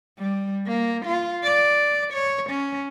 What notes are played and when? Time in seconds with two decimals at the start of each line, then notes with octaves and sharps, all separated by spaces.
0.19 G3
0.67 A#3
1.06 F4
1.43 D5
2.13 C#5
2.50 C#4